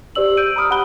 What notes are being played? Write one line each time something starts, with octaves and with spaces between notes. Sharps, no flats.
G4 C5 D5 E6 F#7
E6 G6 D7 D#7
A#5 B5 D#6 F6
G4 F#5 B5 D#6 F#6 G7